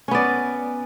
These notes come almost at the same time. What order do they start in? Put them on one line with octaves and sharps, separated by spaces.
C#4 B3 D5